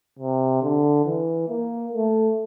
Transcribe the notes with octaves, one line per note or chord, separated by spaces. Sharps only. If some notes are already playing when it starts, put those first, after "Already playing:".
C3
D3
E3
A#3
A3